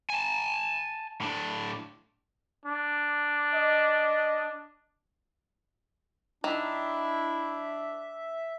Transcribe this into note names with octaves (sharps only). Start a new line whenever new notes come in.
G#5 A5
A2 D4
D4
D#5
D#3 D4 E4 E5